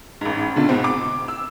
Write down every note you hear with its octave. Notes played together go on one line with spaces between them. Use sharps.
A1 G#2
B1 D3 F4
G#2 B2 C4
D6
E6